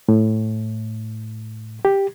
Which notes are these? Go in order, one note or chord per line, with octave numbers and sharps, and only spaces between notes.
A2
G4